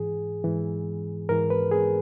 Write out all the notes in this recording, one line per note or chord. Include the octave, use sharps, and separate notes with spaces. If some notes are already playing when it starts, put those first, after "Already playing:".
Already playing: G#2 E3 G#4
G#2 E3
G#2 E3 A#4
B4
G#4